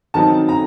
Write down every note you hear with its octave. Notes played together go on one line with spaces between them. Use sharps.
D#3 F#3 C4 D#4 A5
A#5